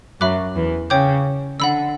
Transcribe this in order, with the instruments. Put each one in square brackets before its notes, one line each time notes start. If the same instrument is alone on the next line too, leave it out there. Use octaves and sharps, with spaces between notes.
[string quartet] F#2 F#3 [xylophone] E5 B5 D6 F#6
[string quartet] E2 E3
[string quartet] C#3 [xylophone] C#5 G5 D6 G6
[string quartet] D3 [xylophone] F#5 B5 E6